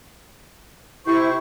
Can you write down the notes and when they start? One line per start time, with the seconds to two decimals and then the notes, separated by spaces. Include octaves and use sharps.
1.07 C3 E4 C5 C#6